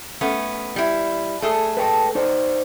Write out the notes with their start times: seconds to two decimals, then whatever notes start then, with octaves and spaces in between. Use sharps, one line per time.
0.21 A3 B3 C#4
0.76 G3 E4
1.42 A3 G#4 A4
1.77 B4 G5 A5
2.15 D#4 C5 D5